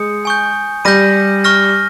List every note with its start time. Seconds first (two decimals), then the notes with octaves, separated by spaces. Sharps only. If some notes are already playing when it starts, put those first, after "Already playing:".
Already playing: G#3 D#6 G6 C#7
0.25 G#5 C#6 G6
0.85 G3 G6 A#6 D#7
1.44 C#6 F6 A#6